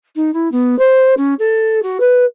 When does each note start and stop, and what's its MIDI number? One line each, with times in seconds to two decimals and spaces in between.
0.15 0.33 63
0.34 0.51 64
0.51 0.78 59
0.79 1.14 72
1.17 1.34 61
1.39 1.82 69
1.83 1.97 66
2.00 2.25 71